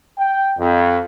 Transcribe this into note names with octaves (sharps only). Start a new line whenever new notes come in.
G5
F2